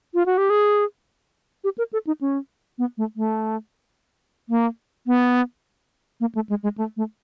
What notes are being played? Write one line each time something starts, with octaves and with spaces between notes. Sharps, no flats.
F4
F#4
G4
G#4
G4
A#4
A4
D#4
C#4
B3
A3
A3
A#3
B3
A#3
A3
G#3
G#3
A3
A3